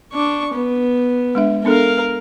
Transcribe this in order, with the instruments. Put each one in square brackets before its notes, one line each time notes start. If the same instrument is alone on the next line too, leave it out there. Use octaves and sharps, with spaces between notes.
[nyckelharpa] D4 C#6
B3
[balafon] G#3 D4 E5
[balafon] B3 D4 A4 [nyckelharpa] A#4 F5